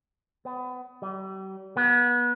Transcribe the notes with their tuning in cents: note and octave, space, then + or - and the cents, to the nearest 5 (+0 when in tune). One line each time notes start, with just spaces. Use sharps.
B3 +30
G3 -40
B3 -30